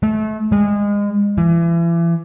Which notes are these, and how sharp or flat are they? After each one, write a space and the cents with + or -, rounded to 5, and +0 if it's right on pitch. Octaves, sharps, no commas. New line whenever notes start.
A3 -30
G#3 -25
E3 +35